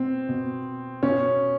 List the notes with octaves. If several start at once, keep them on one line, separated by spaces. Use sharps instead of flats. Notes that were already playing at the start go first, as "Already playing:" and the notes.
Already playing: B2 C4
B2
B2 C#4